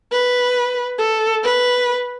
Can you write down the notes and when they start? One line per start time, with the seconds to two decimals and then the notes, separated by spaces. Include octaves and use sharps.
0.12 B4
0.98 A4
1.43 B4